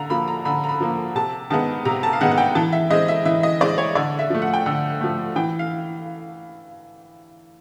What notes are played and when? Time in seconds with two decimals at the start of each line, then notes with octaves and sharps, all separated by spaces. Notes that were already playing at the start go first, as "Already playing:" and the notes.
Already playing: D3 A#5
0.10 F3 A#3 B5
0.28 A#5
0.45 D3 B5
0.64 A#5
0.69 B5
0.80 F3 A#3
1.15 C3 A5
1.50 D#3 G#3 B3 A5
1.85 C3 A#5
2.03 A5
2.13 F5
2.21 D#3 G#3 B3 F#5
2.32 F#5
2.38 G5
2.55 E3 A5
2.72 E5
2.91 G#3 C4 D#5
3.08 E5
3.25 E3 E5
3.43 D#5
3.60 G#3 C4 D5
3.78 C#5
3.95 D3 D5
4.19 E5
4.30 F3 A3
4.42 F#5
4.54 G5
4.66 D3 F#5
5.01 F3 A3
5.36 E3 G5
5.59 F5